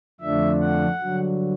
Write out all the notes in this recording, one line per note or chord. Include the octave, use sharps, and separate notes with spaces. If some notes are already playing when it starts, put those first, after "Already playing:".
F2 D3 F3 A3 D4 E5
F#5
G2 D3 F#3